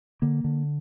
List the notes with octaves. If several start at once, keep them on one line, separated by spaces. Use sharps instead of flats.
D3 A#3
D3